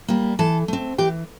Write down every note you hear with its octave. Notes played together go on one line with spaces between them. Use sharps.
G3 A#3
E3 A4 A5
A3 C4
E3 G4 G5